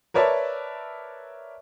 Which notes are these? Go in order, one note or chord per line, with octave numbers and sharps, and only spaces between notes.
A#4 B4 C#5 D5 E5 A5